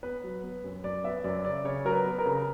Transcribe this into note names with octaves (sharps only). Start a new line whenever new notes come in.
B3 B4
F#3
B3
F#2
F#2 D5
B3 E5
F#2 D5
C#3 D5
C#3 C#5
F#3 A#4
B4
B3
A#4
C#3